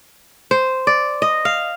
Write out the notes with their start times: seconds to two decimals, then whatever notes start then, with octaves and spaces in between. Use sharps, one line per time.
0.51 C5
0.87 D5
1.22 D#5
1.45 F5